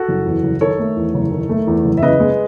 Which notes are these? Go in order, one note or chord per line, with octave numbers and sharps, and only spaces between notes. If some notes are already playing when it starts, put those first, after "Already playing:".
Already playing: F#4 A4
F#1
E2
F#1
D#3 A4 C#5
A3
E2
F#1
D#3
A3
E2
F#1
E5
C#3 B4 D#5
G#3